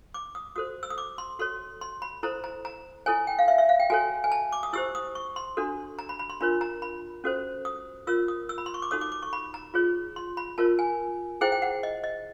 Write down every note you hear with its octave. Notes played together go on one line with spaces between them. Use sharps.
D6
D#6
F#4 A4 C5 D#6
E6
D#6
D6
C6
F#4 A4 C#5 C6
C6
B5
E4 A4 C5 A#5
A#5
A#5
E4 A4 C#5 G#5
G5
F5
E5
E5
F5
G5
F#4 A4 C#5 G#5
G#5
A5
D6
D#6
E4 G4 C5 E6
D#6
C#6
C6
D4 F#4 A4
A#5
B5
B5
C6
D4 F4 A#4 C#5 B5
A#5
B5
C#4 F#4 A4 C5
D#6
F4 A#4 C#5 E6
D#6
E6
B5
C6
C#6
D6
D#4 F#4 A4 C#5 D#6
D6
D6
C#6
B5
A#5
F4 G#4 C#5
C6
B5
F4 A#4 C#5 A5
G#5
E4 G#4 C5 G5
G5
F#5
D#5
D#5